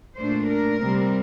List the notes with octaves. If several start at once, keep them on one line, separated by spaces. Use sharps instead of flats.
A#2 A3 D4 C5
A#4
C3 G3 C4